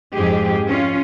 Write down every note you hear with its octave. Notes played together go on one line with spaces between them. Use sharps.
F2 G#2 G#3 G4 G#4
C#4 F4